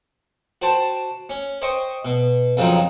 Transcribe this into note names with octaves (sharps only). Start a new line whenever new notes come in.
F#4 C5 G5 A5
C#4
C5 D#5 G5 C#6
B2
F2 C#3 F3 F#3 C4 D#4